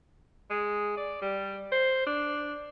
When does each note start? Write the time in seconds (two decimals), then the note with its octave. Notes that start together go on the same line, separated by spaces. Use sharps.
0.50 G#3
0.97 D5
1.22 G3
1.72 C5
2.06 D4